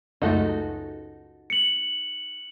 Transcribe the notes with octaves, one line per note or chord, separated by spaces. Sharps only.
C#2 F#2 A3 D#4 F#4 A4
C#7 F#7